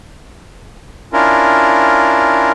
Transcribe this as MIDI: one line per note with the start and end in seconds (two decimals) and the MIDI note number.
1.13 2.52 61
1.13 2.52 62
1.13 2.52 64
1.13 2.52 65
1.13 2.52 70